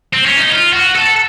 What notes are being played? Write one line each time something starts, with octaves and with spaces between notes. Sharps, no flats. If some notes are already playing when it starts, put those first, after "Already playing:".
C4
C#4
D#4
F4
F#4
A4